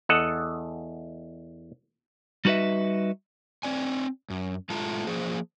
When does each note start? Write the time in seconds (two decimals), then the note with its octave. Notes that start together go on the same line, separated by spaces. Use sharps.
0.09 E2 A4 D#5 F#5
2.45 G3 D#4 F#4 B4 D#5 E5
3.63 C4 D5 G#5
4.30 F#2
4.70 A2 G#3 A3 F4 A5 A#5
5.07 F3 A#3 G#4 C5